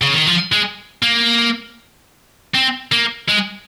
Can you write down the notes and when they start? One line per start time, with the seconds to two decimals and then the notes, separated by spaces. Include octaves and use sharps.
0.02 C#3
0.14 D#3
0.27 F3
0.52 G#3
1.02 A#3
2.54 C4
2.92 A#3
3.29 G#3